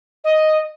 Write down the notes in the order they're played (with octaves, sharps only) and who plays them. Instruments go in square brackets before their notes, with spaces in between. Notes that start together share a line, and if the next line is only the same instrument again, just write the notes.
[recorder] D#5